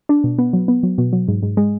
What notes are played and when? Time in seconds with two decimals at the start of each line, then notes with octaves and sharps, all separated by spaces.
0.09 D4
0.24 B2
0.38 B3
0.53 F#3
0.68 B3
0.83 F#3
0.98 B2
1.13 F#3
1.28 G#2
1.43 G#2
1.57 G#3